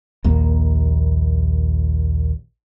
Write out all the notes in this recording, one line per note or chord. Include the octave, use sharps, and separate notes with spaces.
A#1 D#2 A#3